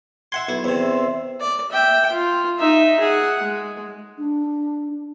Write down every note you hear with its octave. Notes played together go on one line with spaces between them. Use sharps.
E5 F#5 C6 G#6
B1 E4
E2 C3 C5 E5
D5
E5 G5
F4
D#4 E5
G#4 F#5
G#3
D4